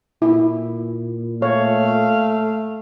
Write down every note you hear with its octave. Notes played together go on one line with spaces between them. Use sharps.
A#2 E4
A3 C#5 F5